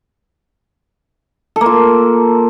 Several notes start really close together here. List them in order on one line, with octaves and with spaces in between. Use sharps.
A4 A#3 F4